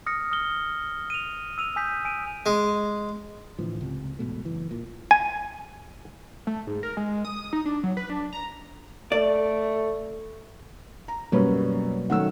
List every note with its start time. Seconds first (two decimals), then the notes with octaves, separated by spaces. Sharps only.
0.06 D#6 F6 A#6 C#7
0.32 D#6 F6 G7
1.10 D#7 F7
1.58 E6 D#7 F7
1.76 G#5 D#6 G6 B6
2.05 G#5 D7 D#7
2.46 G#3
3.59 A2 D3 E3 F3
3.81 C#2 C3
4.19 E1 G#2 B2 A3
4.44 F#1 E3
4.71 A#2
5.11 G#5
6.47 A3
6.67 G#2
6.83 A#4
6.97 G#3
7.25 D#6
7.53 D#4
7.66 D4
7.83 F#3
7.97 B4
8.10 D4
8.33 A#5
9.12 A3 D5
11.08 A#5
11.32 F#2 B2 F#3 G3 A#3 C#4 B4
12.10 D#3 F#3 A3 C#4 F#5 E6